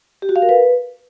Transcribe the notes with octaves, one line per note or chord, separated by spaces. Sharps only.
G4
F#4
F5
A#4
B4